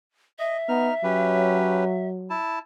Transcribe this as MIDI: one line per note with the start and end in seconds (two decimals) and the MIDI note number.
0.39 0.57 75
0.39 2.07 76
0.69 0.90 59
0.69 0.94 63
0.69 0.94 89
1.04 2.38 54
1.04 1.84 61
1.04 1.84 67
1.04 1.84 71
2.30 2.59 64
2.30 2.59 81